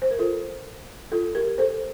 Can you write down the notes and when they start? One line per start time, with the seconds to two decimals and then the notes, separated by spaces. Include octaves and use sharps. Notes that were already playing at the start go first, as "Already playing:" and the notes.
0.02 C5
0.11 A#4
0.19 F4 A4
1.12 F4 A4
1.35 G4 A#4
1.58 A4 C5